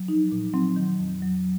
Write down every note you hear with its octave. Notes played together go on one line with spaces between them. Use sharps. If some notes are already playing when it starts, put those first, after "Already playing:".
Already playing: F#3
F3 D#4
A#2
F#3 C4
D#3
F2
F#3